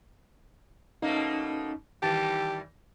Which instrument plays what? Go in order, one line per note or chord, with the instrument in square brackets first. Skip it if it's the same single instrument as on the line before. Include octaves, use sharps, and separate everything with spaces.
[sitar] B2 A3 A#3 [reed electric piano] C#4 D#4
[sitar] D#3 E3 G3 [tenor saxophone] G4 [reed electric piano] A5 A6